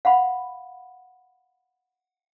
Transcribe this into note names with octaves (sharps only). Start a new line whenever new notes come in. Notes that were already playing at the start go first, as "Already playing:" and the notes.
F5 F#5 B5